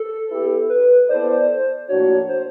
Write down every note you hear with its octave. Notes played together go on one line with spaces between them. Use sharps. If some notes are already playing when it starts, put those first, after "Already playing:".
Already playing: A4
B3 E4 G4 B4
B4
B3 E4 A4 C5 D5
A2 F3 A#3 D4 F#4 C#5
C5